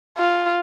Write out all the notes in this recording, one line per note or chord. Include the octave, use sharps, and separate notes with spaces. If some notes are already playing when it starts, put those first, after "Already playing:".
F4